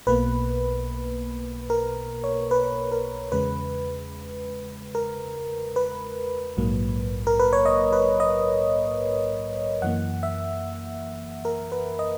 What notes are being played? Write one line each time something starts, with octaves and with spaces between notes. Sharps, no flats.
B1 B2 A#3 B4
A#4
C#5
B4
A#4
E2 C#3 G#3 B4
A#4
B4
A#1 G#2 F#3 A#3
A#4
B4
C#5
D#5
B4
D#5
F#2 E3 A#3 F#5
E5
A#4
B4
D#5